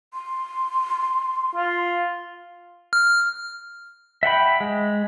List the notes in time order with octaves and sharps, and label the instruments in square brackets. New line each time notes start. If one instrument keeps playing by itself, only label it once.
[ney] C6
[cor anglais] F4
[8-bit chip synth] F6
[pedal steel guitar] E5 F#5 G5 B5
G#3